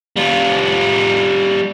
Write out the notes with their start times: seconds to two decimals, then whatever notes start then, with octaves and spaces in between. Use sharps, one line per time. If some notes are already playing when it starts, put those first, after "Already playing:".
0.16 G3 F4